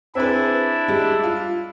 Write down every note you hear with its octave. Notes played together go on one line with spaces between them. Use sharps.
C4 D4 E4 G#4 B4 E5
G3 G#3
F4